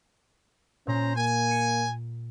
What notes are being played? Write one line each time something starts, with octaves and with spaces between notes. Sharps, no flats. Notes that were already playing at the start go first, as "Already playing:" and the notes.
A#2 C#4 C5 A#5
A#3 G#5
C#7 D#7